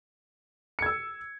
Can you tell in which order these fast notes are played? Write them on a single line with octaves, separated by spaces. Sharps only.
C#7 G#6 E6